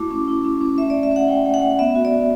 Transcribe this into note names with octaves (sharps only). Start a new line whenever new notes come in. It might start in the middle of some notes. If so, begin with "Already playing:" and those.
Already playing: A3 E4 F#4 D6
C#4
E4
C#4
C#4
A3 E5
A3 D5
E5
C#4 F#5
A3 G5
A3
F#5
A3
B3 E5
F#4
D5
D4